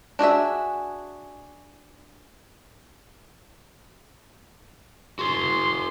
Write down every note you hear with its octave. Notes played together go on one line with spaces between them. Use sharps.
D4 F#4 G#4 E5
F#4 G#4 C6